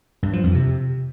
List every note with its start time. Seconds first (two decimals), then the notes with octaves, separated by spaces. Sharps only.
0.23 G2
0.33 F3
0.44 F2
0.54 C3